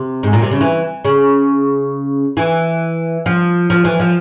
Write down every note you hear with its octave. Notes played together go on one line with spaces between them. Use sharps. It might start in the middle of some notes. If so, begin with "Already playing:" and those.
Already playing: C3
G#2
A#2
C3
C#3
E3
C#3
E3
F3
F3
E3
F3